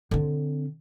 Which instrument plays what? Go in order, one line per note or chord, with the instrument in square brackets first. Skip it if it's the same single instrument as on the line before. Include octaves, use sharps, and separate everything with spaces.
[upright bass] D3 C4